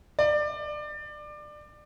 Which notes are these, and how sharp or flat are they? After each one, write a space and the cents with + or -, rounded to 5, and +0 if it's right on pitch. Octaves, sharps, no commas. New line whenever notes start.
D5 +25